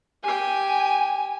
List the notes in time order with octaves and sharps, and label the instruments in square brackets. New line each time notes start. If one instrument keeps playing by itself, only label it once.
[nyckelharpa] G4 G5 [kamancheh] G#5